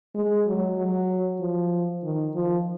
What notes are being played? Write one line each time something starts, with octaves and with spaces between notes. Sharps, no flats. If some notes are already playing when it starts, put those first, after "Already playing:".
G#3
F#3
F#3
F3
D#3
F3